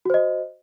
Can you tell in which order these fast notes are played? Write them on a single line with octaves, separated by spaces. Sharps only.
F#4 C5 D#5